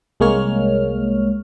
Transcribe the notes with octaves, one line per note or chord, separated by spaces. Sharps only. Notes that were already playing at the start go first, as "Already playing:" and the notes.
C2 G#3 A#3 C#5 F6